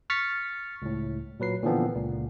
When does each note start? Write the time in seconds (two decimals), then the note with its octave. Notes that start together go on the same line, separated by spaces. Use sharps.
0.10 C#6 F6 A6 B6 C#7
0.82 C#2 A2
1.40 A#2 F#3 B4 C7
1.63 A#2 D3 E3 F3 B3 C4
1.94 C#2 A#2